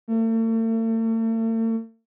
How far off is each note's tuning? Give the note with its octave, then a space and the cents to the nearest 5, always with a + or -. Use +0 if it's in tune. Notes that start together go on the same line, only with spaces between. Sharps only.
A3 +45